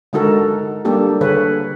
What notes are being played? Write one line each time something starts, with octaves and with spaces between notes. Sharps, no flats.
D3 G#3 D#4 F#4 A4 A#4
G3 A#3 D4 G4 A4
D3 G#4 A4 B4 C#5